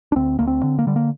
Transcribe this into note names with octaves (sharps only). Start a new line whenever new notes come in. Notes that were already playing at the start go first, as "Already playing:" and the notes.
D4
D2 C4
D2 A#3
C4
D3
A#3
D3 G3
A#3